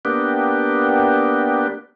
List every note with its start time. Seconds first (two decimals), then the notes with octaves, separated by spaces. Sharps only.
0.05 A#3 B3 D4 G4